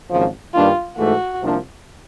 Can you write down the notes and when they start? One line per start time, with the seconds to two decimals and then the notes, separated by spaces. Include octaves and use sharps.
0.11 G#1 F#2 C#3 F3
0.54 G2 D#3 G3 A#3 D4 F4
0.97 G#2 E3 A3 F#4
1.41 C2 C3 F3 A#3 D4